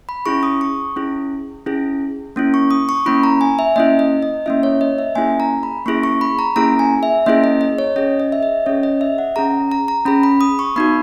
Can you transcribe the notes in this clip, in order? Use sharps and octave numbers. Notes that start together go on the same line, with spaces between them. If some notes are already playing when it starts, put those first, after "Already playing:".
B5
C#4 E4 G#4 C#6
D#6
C#6
C#4 E4 G#4
C#4 E4 G#4
A#3 C#4 E4
C#6
D#6
C#6
A#3 C#4 E4 B5
A#5
G#5
E5
A#3 C#4 E4 D#5
D#5
D#5
A#3 C#4 E4 E5
C#5
D#5
E5
A#3 C#4 E4 G#4 G#5
A#5
B5
A#3 C#4 E4 G#4 C#6
C#6
B5
A#5
A#3 C#4 E4 G#4 A#5
G#5
E5
A#3 C#4 E4 G#4 D#5
D#5
D#5
C#5
C#4 G#4 D#5
D#5
E5
D#5
C#4 G#4 C#5
D#5
E5
F#5
C#4 G#4 A#5
A#5
A#5
C#4 G#4 B5
B5
D#6
C#6
B3 D#4 F#4 B5